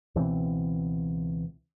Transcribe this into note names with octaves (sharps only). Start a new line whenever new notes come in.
C#2 B2 E3 C4